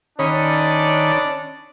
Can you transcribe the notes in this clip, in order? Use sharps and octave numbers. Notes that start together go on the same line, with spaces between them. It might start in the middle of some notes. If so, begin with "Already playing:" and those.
D#3 C#4 D4 D5 D#5 B5